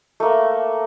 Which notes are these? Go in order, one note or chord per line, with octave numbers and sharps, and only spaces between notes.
A3 A#3